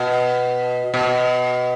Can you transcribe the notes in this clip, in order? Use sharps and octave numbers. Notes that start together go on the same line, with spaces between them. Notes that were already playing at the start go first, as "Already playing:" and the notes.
Already playing: B2
B2